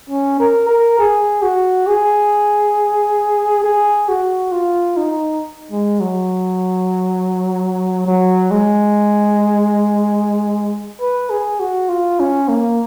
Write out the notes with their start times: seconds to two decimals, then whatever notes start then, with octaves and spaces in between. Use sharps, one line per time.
0.10 C#4
0.40 A#4
0.69 A#4
0.99 G#4
1.43 F#4
1.87 G#4
3.64 G#4
4.09 F#4
4.52 F4
4.97 D#4
5.71 G#3
6.01 F#3
8.06 F#3
8.51 G#3
11.01 B4
11.30 G#4
11.60 F#4
11.89 F4
12.20 C#4
12.49 A#3